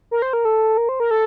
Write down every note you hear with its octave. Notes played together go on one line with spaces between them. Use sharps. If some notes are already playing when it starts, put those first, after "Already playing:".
A#4
C5
A#4
A4
A#4
C5
A#4
A4